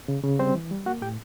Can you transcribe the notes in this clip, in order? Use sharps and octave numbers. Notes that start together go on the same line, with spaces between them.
C#3
C#3
G3 C4 C5
E3
G3
A#3 F#4 F#5
A2 G4 G5